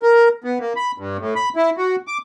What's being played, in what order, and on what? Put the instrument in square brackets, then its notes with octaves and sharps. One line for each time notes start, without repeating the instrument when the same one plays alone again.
[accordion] A#4
B3
A#3
B5
G2
A2
B5
E4
F#4
D6